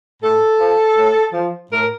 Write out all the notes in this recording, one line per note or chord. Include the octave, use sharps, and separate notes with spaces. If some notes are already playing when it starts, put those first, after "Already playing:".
A2 A4
F3
A2
F3
A2 A#4